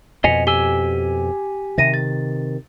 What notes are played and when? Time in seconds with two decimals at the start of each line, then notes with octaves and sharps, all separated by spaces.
0.24 F2 B2 D#5 G#5 B6 C#7 F7
0.47 G4 G#5 E6 G7
1.78 C3 D#3 E5 A#6 D#7
1.94 A6